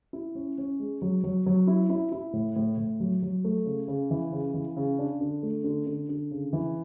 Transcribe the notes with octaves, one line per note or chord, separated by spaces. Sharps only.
E4
C#4
C#4
G#3
F#3
F#3
F#3
E4
E4
E4
A2
A2
A2
F#3
F#3
A3
C#3
C#3
E3
C#3
E3
C#3
D4
D3
A3
D3
D3
D3
C#3
E3